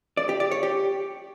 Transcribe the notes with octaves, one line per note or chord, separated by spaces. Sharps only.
D5
G4
D5
C#5
G4